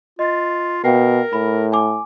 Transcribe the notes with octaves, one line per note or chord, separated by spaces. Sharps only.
F4 D#5 A6
B2 A#4 F5 G5 C7
A2 B5
G#5 D6